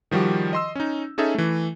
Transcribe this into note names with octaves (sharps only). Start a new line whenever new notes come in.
D#3 F3 G3 F#4 G4
D#5 C6 E6
C#4 D#4
C#4 D#4 G#4 A4 E5
E3 A3